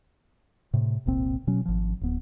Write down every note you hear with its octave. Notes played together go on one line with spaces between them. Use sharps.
A2 C3
F1 C2 A#2 C4
B2 F#3 C#4
G#1 F3
D1 B3